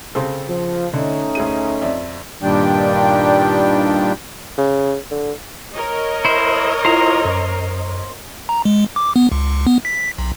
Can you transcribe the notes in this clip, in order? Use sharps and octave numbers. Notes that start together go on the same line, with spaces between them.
C#3 C4 A4
F3
D3 A3 C#4 D#4
D2 G#4 D#7
F2 D5 E5
G2 A#2 D#3 G3 D4 G5
C#3
D3
A#4 C#5 D#5
E4 C5
E4 F4 C5 A#5 A#6
F#2
A#5
G#3
D6
B3
C#2
B3
B6
B1